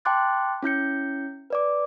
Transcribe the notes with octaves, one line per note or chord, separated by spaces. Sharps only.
G5 A5 C6 D6 F#6 A6
C#4 E4 G6 C#7
B4 D5 D6